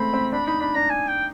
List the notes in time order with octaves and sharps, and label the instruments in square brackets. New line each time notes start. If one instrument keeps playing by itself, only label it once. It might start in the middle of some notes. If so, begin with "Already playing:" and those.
Already playing: [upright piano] G#3 A3 C4 [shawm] B5
[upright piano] C4
[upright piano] D4 [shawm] B5
[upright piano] D#4 [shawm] B5
[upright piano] D4 [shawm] B5
[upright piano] D4 [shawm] A#5
[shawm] G#5
G5